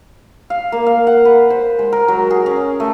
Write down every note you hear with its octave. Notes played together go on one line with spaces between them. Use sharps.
F5
A#3
F5
F#5
B4
C5
G#3
A#4
F#3
G#4
C#4
A3